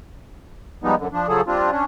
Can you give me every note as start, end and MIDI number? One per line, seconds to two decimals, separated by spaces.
0.84 0.95 53
0.84 0.95 55
0.84 0.95 56
0.84 0.95 59
0.84 0.95 63
0.98 1.07 42
0.98 1.07 50
1.13 1.28 53
1.13 1.28 62
1.28 1.41 49
1.28 1.41 53
1.28 1.41 54
1.28 1.41 68
1.28 1.41 69
1.47 1.71 55
1.47 1.71 60
1.47 1.71 62
1.47 1.71 65
1.71 1.85 61
1.71 1.85 62